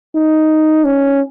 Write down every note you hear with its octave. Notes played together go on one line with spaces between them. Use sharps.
D#4
C#4